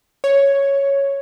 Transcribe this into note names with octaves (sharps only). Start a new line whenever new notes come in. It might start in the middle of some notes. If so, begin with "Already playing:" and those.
C#5